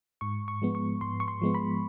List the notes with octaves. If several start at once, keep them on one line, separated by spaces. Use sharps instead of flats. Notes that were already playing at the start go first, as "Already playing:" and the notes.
G#2 C#6
C#6
F3 G#3 B3
C#6
G#2 C6
C#6
C6
F3 G#3 B3
B5